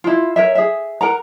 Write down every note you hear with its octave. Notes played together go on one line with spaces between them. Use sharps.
E4 F4
A#4 C#5 E5
G#4 E5
A#4 F#5 A#5